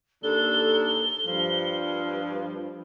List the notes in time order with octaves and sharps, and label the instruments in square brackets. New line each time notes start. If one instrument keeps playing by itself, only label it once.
[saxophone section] D#2 D4 A4 [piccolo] G7
[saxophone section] G2 F3